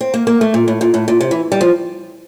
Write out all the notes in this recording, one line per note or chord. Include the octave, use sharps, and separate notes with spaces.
C4
A#3
A#3
A3
A#2
A2
A#2
A2
A#2
C3
E3
G3
F3